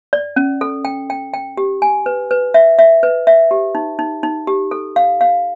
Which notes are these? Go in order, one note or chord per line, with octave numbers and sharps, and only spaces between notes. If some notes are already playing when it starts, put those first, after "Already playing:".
D5
C#4
A4
G5
G5
G5
G4
G#5
B4
B4
E5
E5
B4
E5
G4
D#4
D#4
D#4
G4
A4
F5
F5